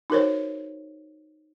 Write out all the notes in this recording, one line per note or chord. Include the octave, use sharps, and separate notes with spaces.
D#4 F#4 A#4 C5 C#5